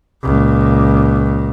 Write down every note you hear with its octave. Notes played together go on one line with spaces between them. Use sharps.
C#2 A#2